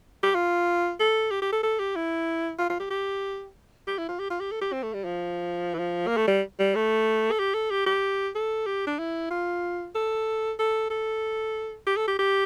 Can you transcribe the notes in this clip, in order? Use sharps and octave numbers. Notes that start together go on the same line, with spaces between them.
G4
F4
A4
G4
G4
A4
A4
G4
E4
F4
F4
G4
G4
G4
E4
F4
G4
F4
G4
A4
G4
C4
A3
G3
F3
E3
F3
A#3
A3
G3
G3
A3
A4
G4
A4
G4
G4
A4
G4
D4
E4
F4
A4
A4
A4
G4
A4
G4
G4